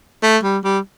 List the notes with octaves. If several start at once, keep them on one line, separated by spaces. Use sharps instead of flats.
A3
G3
G3